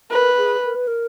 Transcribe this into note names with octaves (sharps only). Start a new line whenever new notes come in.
A#4 B4
G#4
A#4
B4
A#4